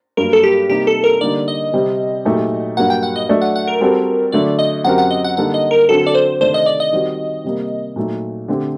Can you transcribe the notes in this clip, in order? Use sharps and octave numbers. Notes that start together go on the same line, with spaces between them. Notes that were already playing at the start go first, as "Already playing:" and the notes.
G2 F#3 A#3 A#4
A4
G4
C3 G3 A#3 D#4 G4
A4
A#4
D3 G3 A#3 D#4 D5
D#5
C3 G3 C4
A#2 F#3 A3 D#4 G4
G2 F#3 A#3 F#5
G5
F#5
D#5
F#3 A3 D4
F#5
F#5
A#4
G3 C4 F#4 A4
D3 F#3 A3 D5
D#5
F#2 F#3 C4 G4 A#4 F#5
F#5
D#5
F#5
D3 G3 A#3 D#4 A4 F#5
D#5
A#4
D3 F#3 C4 F#4 A4
D5
C5
C3 D#3 A3 D4 A4 C5
D#5
D5
D#5
D#3 G3 C4 F#4
C3 G3 A#3
A#2 F#3 A3 D#4
D3 A3 C4 G4 C5